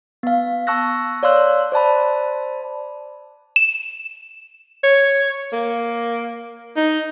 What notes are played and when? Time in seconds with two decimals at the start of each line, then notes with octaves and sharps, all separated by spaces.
0.23 B3 F5
0.67 A5 C#6 E6 F#6 A#6
1.23 C#5 D5 F5 C6 E6 F#6
1.72 C5 D5 A5 B5
3.56 E7
4.83 C#5
5.53 A#3
6.76 D#4